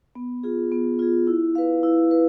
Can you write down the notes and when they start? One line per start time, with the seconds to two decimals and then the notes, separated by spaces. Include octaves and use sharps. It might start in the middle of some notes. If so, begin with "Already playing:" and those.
0.15 B3
0.43 F4 G#4
0.72 B3
0.99 F4 G#4
1.27 E4
1.55 B4 F5
1.83 E4
2.11 B4